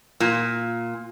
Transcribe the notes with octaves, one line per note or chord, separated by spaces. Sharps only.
A#2